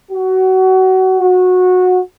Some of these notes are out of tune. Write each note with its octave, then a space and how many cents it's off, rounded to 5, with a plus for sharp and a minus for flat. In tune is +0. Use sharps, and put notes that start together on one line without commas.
F#4 +25
F#4 -20